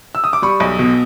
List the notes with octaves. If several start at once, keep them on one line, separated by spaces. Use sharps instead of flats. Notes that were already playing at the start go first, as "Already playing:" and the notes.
E6
D#6
D6
G3 B5 C#6
B1
B2